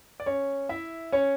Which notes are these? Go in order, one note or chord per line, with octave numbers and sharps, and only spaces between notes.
D5
C#4 C#5
E4 E5
C#4 C#5